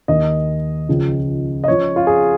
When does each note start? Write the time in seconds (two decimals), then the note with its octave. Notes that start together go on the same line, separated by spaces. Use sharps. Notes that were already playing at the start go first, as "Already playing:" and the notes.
0.08 D#2 D#3 D#5
0.89 C#2 C#3 F3
1.64 D#5
1.68 C#2 C#3 F3 C#5
1.96 F4
2.07 G#4